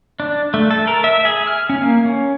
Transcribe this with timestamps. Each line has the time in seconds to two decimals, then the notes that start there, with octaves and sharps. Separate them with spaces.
0.20 D4
0.54 A3
0.71 A4
0.87 A#4
1.04 E5
1.25 G#4
1.47 F6
1.70 C#4
1.81 A#3
2.05 C#4